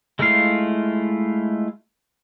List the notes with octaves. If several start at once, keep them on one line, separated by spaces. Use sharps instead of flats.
G#3 A3 E4 F4 F5